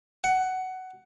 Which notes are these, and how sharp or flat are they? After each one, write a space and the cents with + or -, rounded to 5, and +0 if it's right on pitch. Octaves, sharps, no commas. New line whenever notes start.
F#5 +15